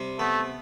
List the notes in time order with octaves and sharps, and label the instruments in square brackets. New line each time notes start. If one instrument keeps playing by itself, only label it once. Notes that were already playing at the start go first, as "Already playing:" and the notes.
Already playing: [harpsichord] C3 G3
[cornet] A3 [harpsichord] B3